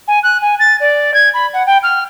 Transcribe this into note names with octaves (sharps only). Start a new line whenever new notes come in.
G#5
F#6
G#5
A6
D5
G#6
B5
F#5
G5
F6